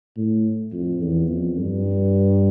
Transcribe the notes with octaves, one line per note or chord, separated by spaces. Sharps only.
A2
F2
E2
F2
G2